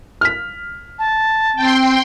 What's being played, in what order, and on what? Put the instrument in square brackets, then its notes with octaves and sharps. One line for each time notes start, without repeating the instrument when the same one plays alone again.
[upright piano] F6 B6
[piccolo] A5
[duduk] C4 [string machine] G5 C6